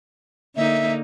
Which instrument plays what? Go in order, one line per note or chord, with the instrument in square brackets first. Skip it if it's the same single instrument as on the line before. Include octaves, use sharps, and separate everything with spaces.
[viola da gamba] D3 A#3 D#4 [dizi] E5